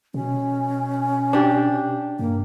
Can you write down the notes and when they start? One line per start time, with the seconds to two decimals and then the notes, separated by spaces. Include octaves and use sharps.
0.14 B2 C#4
1.33 D4 G4
2.19 G2 A#3